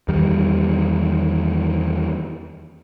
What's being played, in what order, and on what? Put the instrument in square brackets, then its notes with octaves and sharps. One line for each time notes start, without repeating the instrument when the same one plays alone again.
[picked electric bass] E2 D#3 G3